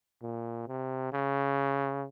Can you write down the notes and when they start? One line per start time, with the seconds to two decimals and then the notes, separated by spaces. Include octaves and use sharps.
0.22 A#2
0.68 C3
1.12 C#3